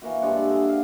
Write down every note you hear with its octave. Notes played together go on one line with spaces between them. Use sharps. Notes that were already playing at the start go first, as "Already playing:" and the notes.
E3 A#3 F#4
G2 G#3 D4 C#6
D5 E5
D3 G#4
F5